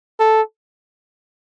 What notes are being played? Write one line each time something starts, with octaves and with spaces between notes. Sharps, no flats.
A4